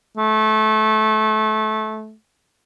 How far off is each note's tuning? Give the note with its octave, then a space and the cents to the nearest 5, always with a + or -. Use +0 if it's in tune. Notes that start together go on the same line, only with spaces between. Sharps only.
A3 -20